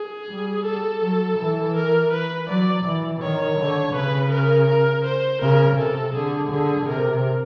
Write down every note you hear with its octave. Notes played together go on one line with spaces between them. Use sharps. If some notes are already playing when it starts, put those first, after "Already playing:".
Already playing: G#4
G3
A4
F#3
E3
A#4
B4
F#3 D5
E3
D#3 C#5
D3
C#3 B4
A#4
A#4
C5
C#3 A#4
C3 A4
D3 G#4
D3 G#4
C3 A#4